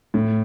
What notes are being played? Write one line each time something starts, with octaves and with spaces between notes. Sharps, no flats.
A2